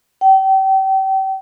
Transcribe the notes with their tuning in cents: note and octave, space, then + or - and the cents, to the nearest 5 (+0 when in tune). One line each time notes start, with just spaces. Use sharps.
G5 -35